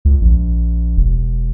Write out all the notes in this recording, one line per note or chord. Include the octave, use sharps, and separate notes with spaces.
C#2
A#1
E1